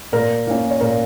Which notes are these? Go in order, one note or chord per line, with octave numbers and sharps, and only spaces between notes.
A#2 A#4
A#3 C#4
C#5
A#2 A#4